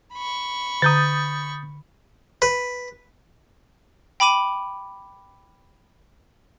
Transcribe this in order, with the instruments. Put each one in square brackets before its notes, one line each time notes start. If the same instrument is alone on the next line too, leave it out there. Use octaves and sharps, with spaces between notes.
[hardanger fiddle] B5 C#6
[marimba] D3 A#5 [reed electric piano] D#6 G6 A6
[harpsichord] B4
[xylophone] G5 B5 D6 D#7